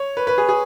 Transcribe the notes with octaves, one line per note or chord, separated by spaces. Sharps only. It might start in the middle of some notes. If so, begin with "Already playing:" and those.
Already playing: C#5
B4
B4
G#4
G#4